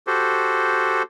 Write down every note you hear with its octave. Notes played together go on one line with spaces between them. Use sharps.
F#4 G4 A4 C5